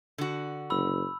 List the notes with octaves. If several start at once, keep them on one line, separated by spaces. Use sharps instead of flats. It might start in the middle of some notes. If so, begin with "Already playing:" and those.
D3 F#4
F#1 B5 E6